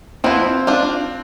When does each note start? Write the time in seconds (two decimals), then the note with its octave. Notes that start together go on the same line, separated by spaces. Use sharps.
0.24 F3 B3 C4 E4
0.67 D4 F4 C5